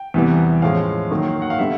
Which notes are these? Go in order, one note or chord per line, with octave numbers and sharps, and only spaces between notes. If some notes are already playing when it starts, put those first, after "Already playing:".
Already playing: G5
E2 C3 E3 G3 B3
A2 F3 G#3 C#4 F5
D#3 F#3 A#3
F#5
F5
D3 G3 B3 E5